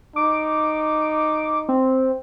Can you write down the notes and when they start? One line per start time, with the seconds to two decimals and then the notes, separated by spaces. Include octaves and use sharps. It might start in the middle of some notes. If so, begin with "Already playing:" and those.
0.16 D#4 D6
1.69 C4